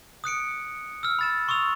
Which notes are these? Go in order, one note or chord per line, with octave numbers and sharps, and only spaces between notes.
D#6 F#6 C#7 D7
E6 F6
B5 A6 E7
C6 C#6 D#6 E6 F7